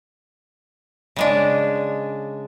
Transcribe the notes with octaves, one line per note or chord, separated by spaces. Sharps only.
C#3 G#3 D4